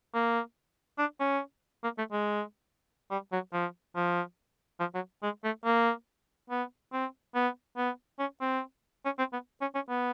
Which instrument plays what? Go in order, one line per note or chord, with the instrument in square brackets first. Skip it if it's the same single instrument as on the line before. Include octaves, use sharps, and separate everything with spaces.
[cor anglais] A#3
D4
C#4
A#3
A3
G#3
G3
F#3
F3
F3
F3
F#3
G#3
A3
A#3
B3
C4
B3
B3
C#4
C4
C#4
C4
B3
C#4
C#4
B3